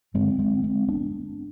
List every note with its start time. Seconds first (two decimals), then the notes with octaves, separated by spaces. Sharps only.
0.14 G2 D3 G#3 C4
0.39 G#3 C4
0.63 G#3 C4
0.88 B3 D4